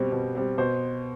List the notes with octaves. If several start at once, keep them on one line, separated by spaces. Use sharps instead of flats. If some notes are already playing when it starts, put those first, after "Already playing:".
Already playing: B2 G3 C4
B2
G3 C4
B2 C5